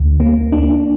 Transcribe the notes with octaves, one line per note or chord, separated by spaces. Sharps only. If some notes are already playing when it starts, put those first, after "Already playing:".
Already playing: D2
A#3
D4